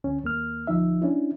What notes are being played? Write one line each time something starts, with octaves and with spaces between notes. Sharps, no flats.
D2 C#4
D#2 A#3 F6
D2 F3 D#4 E5
C#4 D4 E4